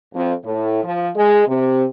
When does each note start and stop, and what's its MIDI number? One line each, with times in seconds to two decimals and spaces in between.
0.15 0.33 41
0.45 0.83 45
0.84 1.10 53
1.16 1.46 56
1.47 1.85 48